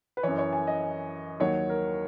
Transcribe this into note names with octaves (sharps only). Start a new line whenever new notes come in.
B4
F#2 E3 C#5
C#5
G#5
D#5
D#2 D#3 F#3 C#5
A#4